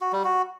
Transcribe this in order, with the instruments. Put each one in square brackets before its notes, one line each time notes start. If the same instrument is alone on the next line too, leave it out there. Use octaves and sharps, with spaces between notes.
[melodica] F#4
G3
F#4